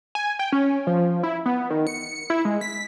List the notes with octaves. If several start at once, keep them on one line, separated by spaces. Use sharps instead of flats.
G#5
G5
C#4
F3
E4
B3
D#3
C#7
E4
G#3
B6